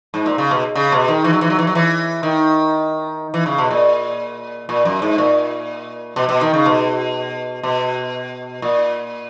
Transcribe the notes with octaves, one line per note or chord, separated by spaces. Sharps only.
G#2
A#2
C#3
B2
C#3
B2
D#3
E3
F#3
E3
F#3
E3
F#3
E3
D#3
E3
C#3
B2
A#2
A#2
F#2
G#2
A#2
B2
B2
D#3
C#3
B2
B2
A#2